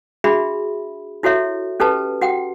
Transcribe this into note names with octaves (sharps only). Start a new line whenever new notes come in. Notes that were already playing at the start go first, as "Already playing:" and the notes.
D4 F#4 G#4 E5 B5
E4 F#4 A4 C#5 E5
C#4 G4 A4 B4 A5
F#4 F#5 G5